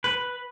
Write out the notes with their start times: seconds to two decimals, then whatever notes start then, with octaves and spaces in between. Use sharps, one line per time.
0.04 B4